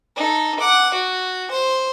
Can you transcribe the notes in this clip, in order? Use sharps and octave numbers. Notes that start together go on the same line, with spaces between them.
D#4 A4
F#5 D6
F#4
C5